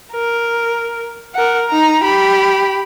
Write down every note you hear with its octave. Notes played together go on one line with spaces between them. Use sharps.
A#4
A#4 F#5
D#4 A#5
G4 B5